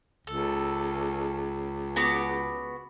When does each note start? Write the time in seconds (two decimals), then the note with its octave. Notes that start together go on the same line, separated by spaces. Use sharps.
0.27 C#2 A4
1.96 B3 F#4 D6